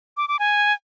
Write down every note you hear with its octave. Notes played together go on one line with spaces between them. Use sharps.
D6
D6
G#5